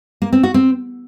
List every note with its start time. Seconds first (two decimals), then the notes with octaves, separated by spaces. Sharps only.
0.22 A#3
0.33 C4
0.43 F#4
0.54 C4